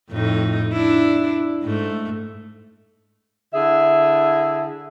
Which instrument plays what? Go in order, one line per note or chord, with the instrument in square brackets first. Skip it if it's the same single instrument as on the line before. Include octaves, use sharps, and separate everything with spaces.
[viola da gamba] F2 A2 D#4
D4 E4
G#2 A3
[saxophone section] D3 E4 G#4 E5